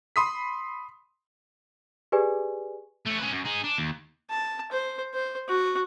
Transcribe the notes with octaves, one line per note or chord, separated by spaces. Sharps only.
B5 C6 D#6 B6
G4 G#4 B4 D5 G#5
A3 C#4
C#4 B4
F#2
D#4 G#4
D4
D#2
A5
C5
C5
F#4